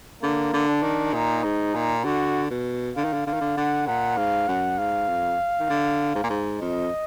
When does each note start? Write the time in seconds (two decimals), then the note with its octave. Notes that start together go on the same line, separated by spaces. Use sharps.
0.22 D3 A#3
0.53 D3
0.68 D4
0.83 D#3
1.13 A#2 D#4
1.44 G#2
1.75 A#2
2.04 D3 F#4
2.50 B2
2.96 D3 F5
3.05 D#3
3.13 D3
3.26 D3 F5
3.33 D#3
3.41 D3
3.57 D3 F#5
3.87 A#2 F#5
4.17 G#2 F5
4.48 F#2 F#5
4.78 G#2 F5
5.09 F2
5.60 D#3
5.70 D3
6.15 G#2
6.23 A#2
6.30 G#2
6.61 F2 D#5